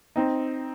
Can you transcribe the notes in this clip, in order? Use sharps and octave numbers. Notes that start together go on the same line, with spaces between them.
C4 D#4